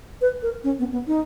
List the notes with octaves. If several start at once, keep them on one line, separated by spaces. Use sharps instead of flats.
B4
A#4
C#4
B3
B3
D#4